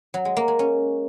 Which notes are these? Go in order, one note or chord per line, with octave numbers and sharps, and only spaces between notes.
F#3
G#3
A#3
G#3
C#4